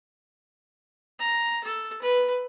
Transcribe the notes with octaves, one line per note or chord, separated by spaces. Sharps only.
A#5
A4
B4